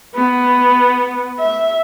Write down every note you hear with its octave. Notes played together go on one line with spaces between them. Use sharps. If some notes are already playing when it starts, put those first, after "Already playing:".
B3
E5